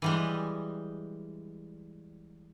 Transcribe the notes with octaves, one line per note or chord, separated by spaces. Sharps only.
E3 G3 G#3